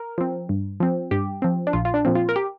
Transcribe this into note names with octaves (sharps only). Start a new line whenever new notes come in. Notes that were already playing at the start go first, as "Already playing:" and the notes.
Already playing: A#4
F3 C4
G2
F3 C4
G2 G4
F3 C4
D4
A#1 F4
F4
D4
A#2 F3 C4
F4
A#4
G4